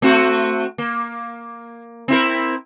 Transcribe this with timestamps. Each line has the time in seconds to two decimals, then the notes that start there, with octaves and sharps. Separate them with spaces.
0.02 A3 C4 F#4
0.78 A#3
2.08 C4 E4 A#4